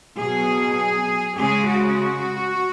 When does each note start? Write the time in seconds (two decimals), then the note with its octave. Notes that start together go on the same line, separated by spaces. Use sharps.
0.18 B2 F#3 G#4
1.37 C#3 G#3 G#4
1.68 F#4